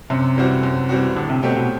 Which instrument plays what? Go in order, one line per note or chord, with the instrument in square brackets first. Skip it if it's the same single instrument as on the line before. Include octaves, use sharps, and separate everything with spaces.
[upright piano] F#2 [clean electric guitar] C3
[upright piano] E3 G3 C4 F#4
F#2
E3 G3 C4 F#4
[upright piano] A2 [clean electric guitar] D3
[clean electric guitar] C3
[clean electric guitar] B2 [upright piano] F#3 A3 C4 G4
[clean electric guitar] B2